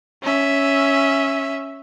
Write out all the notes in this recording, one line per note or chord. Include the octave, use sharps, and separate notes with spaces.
C#4 E5